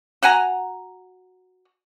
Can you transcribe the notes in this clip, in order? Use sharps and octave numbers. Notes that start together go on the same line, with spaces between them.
F#4 F#5 G#5 A#5